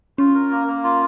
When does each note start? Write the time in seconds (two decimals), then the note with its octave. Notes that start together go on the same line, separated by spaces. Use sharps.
0.18 C#4 F4
0.35 A#4
0.51 A#3
0.68 A#3
0.84 F4